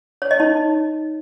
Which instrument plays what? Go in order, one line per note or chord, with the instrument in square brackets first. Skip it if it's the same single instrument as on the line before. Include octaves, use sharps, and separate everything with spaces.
[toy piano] C#5
D#5
D#4